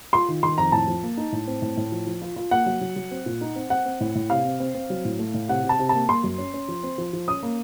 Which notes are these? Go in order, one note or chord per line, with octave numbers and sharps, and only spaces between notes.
F4 C6
D#3
D#3 C6
F2 A#5
A2 A5
F3
A#3
D#4
A2
C4
A2
A2
F3
F3
F4
F4
A#3 F#5
F#3
F#3
F#3
C4
A#2
D#4
C4
C4 F#5
C4
A2
A2
C3 F5
C4
C4
C4
F#3
A2
A3
A2
C3 F#5
C3
A5
C3
A#3 A5
A#3 C6
F#2
C#4
C#4
F3
C4
F3
F3
C#4 D#6
A#3